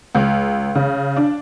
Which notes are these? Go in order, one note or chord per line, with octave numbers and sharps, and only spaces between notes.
C#2
C#3
D4